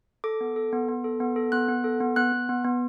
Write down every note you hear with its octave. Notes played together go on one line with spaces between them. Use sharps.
A4 D6
B3
A4
B3
B3
A4
B3
A4
B3 F#6
B3
A4
B3
B3 F#6
B3
B3
B3